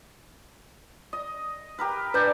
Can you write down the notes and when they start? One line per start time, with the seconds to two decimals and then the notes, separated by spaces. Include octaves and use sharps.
1.13 D#5
1.79 G4 A#4 B4
2.14 D4 B4 D5 G#5 G6